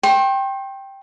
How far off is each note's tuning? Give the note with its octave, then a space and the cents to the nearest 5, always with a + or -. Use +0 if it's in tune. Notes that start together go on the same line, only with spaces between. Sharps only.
G5 +0 C6 +45